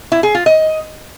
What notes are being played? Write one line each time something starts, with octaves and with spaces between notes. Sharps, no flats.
E4
G#4
F4
D#5